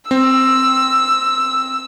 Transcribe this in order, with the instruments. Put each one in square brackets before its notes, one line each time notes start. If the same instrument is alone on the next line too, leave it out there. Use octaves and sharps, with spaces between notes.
[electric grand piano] C4 [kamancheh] E6